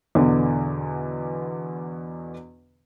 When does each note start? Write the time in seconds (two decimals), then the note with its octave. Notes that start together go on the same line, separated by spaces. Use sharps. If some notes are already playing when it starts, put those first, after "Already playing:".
0.15 E2 B2 D3